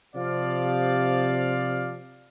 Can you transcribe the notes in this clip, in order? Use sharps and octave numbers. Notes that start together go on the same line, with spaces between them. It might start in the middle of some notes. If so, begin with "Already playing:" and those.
C3 F3 D5 F5